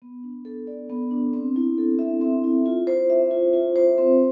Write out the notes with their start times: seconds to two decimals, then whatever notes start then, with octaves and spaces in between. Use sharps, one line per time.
0.02 B3
0.23 D4
0.45 A4
0.67 D5
0.90 B3
1.11 D4
1.33 C4
1.56 E4
1.78 A4
1.99 E5
2.21 C4
2.44 E4
2.66 F4
2.87 C5
3.10 E5
3.31 F4
3.53 F4
3.76 C5
3.98 C4